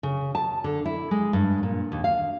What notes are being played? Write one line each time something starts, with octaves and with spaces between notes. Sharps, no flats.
C#3
A5
D3
E4
G#3
G2
A#2
D#2
F5